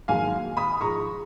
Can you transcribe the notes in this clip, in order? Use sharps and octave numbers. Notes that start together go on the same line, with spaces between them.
G#2 D#3 F#3 A#3 F5 G#5
B5 D#6
G#2 F3 G#3 A#5 C#6